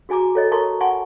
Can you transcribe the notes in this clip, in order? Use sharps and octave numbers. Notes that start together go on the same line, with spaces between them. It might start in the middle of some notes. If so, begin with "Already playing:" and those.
F#4 G#4 G#5 A#5 D6
A4 C#5 D#5
A4 A#4 A5 A#5 C6 C#6
F#5 G#5 A5 C6 C#6